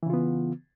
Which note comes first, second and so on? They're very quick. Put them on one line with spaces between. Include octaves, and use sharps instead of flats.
E3 C#3 F4 B3